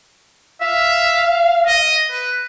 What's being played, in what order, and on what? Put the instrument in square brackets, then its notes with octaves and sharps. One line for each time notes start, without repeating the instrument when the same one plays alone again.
[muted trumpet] E5 [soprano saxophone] F5
[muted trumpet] D#5
B4